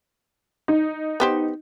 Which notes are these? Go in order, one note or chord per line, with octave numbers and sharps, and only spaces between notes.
D#4
B3 G4 C5